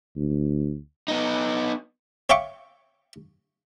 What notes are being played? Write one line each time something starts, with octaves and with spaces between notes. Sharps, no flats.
D2
B3 D#4
C#5 E5 F5 G5 C#6 D6